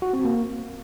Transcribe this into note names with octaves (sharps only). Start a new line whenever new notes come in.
F#4
C4
A#3